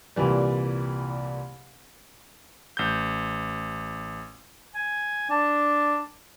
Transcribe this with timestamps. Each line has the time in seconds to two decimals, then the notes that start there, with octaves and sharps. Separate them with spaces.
0.16 C2 A#2 E3 G3
2.77 A1 G6
4.74 G#5
5.30 D4 A5